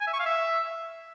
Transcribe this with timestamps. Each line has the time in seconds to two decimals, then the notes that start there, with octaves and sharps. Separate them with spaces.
0.01 G#5
0.07 E5
0.13 C#6
0.19 F5
0.26 E5